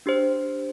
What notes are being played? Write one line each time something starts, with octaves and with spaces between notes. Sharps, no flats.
D4 G4 C5